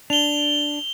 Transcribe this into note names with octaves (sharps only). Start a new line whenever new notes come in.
D4 F7 G7